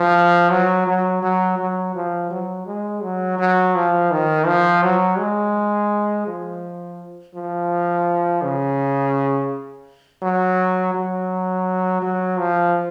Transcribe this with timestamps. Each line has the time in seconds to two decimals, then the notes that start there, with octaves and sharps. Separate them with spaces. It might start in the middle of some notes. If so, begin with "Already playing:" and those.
Already playing: F3
0.51 F#3
0.87 F#3
1.23 F#3
1.59 F#3
1.95 F3
2.30 F#3
2.67 G#3
3.03 F#3
3.39 F#3
3.75 F3
4.11 D#3
4.46 F3
4.83 F#3
5.18 G#3
6.27 F3
7.35 F3
8.42 C#3
10.22 F#3
10.94 F#3
12.02 F#3
12.38 F3